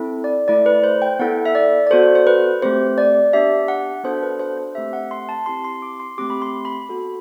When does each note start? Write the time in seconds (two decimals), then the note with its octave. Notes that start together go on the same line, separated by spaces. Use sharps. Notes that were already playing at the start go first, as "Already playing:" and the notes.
Already playing: C4 E4 A4
0.24 D5
0.48 A3 E4 A4 D5
0.66 B4
0.84 C5
1.02 G5
1.19 B3 E4 A4 F#5
1.45 E5
1.55 D5
1.87 D5
1.91 B3 F#4 A4 C5
2.15 C5
2.27 B4
2.62 A3 C4 G4 C5
2.98 D5
3.33 B3 D4 G4 E5
3.68 F#5
4.04 B3 D4 F#4 A4 C5
4.23 B4
4.40 C5
4.57 C5
4.75 A3 C4 G4 E5
4.93 F#5
5.11 C6
5.29 A5
5.46 C4 E4 G4 C6
5.64 C6
5.82 D6
6.00 C6
6.18 A3 C4 G4 D6
6.30 B5
6.42 C6
6.65 B5
6.89 B3 F#4 A4